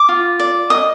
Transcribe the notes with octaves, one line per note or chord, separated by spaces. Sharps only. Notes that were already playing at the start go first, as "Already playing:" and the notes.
Already playing: D6
F4
D5
D#5 D#6